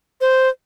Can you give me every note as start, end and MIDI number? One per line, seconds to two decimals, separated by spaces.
0.21 0.49 72